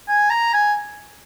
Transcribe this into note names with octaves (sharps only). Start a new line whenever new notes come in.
G#5
A#5
G#5